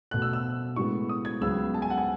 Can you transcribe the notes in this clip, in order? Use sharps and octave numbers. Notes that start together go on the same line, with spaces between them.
B2 A3 F#6
E6
E6
A2 G#3 B3 C#6
D#6
G#6
C#2 C#3 F#3 B3 E6
A5
G#5
F#5
G#5